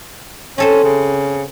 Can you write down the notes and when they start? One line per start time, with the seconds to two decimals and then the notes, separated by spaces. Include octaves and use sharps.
0.58 C4 C#4 A4 C5
0.84 C#3